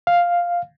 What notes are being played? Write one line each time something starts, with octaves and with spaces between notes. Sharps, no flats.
F5